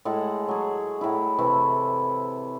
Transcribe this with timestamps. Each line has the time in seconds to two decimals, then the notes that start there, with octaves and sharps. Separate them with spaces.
0.05 A2 G#3 A4 F#5
0.48 F#3 G#4
1.01 A2 E4
1.39 C3 E3 A3